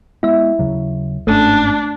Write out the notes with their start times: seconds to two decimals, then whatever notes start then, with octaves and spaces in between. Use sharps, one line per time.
0.23 G#3 B3 E4 E5
0.59 D#2 C#3 F#3
1.27 G1 G#2 A3 C#4 D4